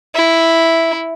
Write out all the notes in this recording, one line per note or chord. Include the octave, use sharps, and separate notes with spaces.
E4